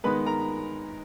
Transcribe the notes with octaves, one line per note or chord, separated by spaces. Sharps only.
D#3 G#3 B3 B4 B5
A#4 A#5